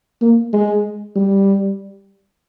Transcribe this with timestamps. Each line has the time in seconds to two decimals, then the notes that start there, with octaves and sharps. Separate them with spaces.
0.22 A#3
0.53 G#3
1.16 G3